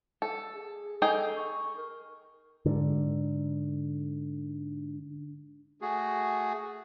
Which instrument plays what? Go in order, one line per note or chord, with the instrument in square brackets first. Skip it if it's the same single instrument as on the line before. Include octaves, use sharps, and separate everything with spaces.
[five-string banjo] A4
[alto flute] G#4
[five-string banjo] D#4 G#4 G5 [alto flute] A4
[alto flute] C#6
A#4
[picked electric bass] G#2 D3
[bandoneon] A3 F#4 G#4